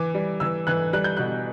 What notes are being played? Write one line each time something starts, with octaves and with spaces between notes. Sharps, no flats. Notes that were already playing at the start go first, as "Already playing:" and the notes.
Already playing: E3 D6
G3
E3 E6
E3 F#6
G3 F#6
G6
B2 F#6